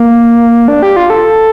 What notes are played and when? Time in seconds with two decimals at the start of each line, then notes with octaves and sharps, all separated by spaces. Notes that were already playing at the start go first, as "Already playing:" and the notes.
Already playing: A#3
0.68 D4
0.82 G4
0.96 F4
1.10 A4